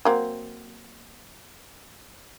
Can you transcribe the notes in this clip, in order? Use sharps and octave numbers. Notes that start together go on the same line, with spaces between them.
F#3 A#3 C4